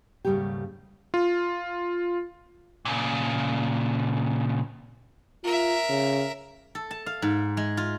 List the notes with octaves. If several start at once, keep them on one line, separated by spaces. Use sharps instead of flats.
D#2 G#2 C#3 G3 A3 G4
F4
A#2 C#3
F4 A#4 E5
C#3
A4
A5
F5
G#2
G#3
F4